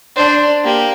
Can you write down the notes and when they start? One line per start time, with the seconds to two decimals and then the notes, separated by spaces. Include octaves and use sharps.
0.16 D4 C5
0.65 A#3 G4